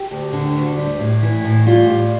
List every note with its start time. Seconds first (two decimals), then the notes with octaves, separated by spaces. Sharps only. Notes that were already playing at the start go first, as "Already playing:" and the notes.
Already playing: G4
0.11 D2
0.33 D3
0.55 D2
0.78 G3
0.99 A2
1.22 E3
1.44 A2
1.67 G3 F4
1.90 A2